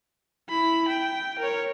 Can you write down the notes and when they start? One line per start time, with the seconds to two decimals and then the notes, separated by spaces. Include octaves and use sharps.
0.49 E4 B5
0.88 G5
1.39 A#4 C#5